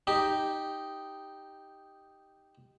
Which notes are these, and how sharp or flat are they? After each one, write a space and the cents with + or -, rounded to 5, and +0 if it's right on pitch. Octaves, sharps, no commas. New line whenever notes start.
D#4 +0 G4 +0